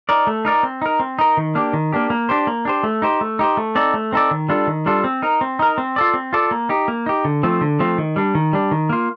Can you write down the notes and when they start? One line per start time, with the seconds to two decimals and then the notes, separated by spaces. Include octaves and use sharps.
0.09 D#4 A#4 D5
0.27 A3
0.45 D#4 A#4 D5
0.63 C4
0.82 D#4 A#4
1.00 C4
1.19 D#4 A#4
1.37 D#3
1.55 A#3 D4 G4
1.73 D#3
1.93 A#3 D4 G4
2.10 A#3
2.29 D4 G4 C5
2.47 A#3
2.65 D4 G4 C5
2.83 A3
3.02 D#4 G4 C5
3.21 A3
3.39 D#4 G4 C5
3.57 A3
3.75 C4 D#4 A4 D5
3.94 A3
4.12 C4 D#4 A4 D5
4.31 D#3
4.49 G3 D4 F4 A4
4.67 D#3
4.86 G3 D4 F4 A4
5.04 C4
5.22 D#4 A#4
5.41 C4
5.59 D#4 A#4
5.78 C4
5.96 F4 A4 D5
6.14 C4
6.33 F4 A4 D5
6.51 A#3
6.69 D#4 G4
6.88 A#3
7.06 D#4 G4
7.25 D3
7.43 F3 A3 C4 F4
7.61 D3
7.79 F3 A3 C4 F4
7.98 D#3
8.16 G3 D4
8.35 D#3
8.53 G3 D4
8.71 D#3
8.89 A#3 F4